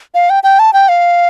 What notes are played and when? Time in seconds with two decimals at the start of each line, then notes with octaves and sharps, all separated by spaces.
0.14 F5
0.30 G5
0.43 G5
0.59 A5
0.73 G5
0.89 F5